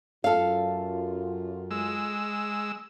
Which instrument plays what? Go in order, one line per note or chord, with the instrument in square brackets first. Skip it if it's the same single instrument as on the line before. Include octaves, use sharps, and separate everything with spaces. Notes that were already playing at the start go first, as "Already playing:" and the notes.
[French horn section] F#2 F4 [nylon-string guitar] A4 F5
[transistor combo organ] G#3 E6